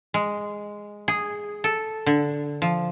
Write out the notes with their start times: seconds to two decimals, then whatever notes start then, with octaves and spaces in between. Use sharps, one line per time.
0.14 G#3
1.08 G#4
1.64 A4
2.06 D3
2.62 F3